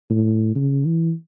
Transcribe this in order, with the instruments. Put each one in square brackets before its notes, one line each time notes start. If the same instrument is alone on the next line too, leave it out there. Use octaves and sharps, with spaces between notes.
[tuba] A2
C#3
E3